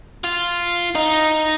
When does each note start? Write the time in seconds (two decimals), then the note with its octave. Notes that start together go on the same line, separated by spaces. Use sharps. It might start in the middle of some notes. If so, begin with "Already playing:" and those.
0.24 F4
0.95 D#4